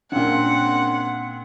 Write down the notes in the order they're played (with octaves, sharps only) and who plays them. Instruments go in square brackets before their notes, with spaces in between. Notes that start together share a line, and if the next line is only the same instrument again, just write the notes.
[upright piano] A#2 C#3 [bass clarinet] C4 [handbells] D4 [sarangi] F#5